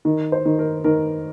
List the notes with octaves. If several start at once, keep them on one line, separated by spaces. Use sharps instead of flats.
D#3
C5
D#3
A#4
D#3 A#4